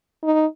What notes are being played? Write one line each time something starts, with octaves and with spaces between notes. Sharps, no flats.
D#4